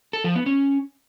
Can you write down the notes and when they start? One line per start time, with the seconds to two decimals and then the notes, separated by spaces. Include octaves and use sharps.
0.13 A4
0.24 F3
0.35 B3
0.46 C#4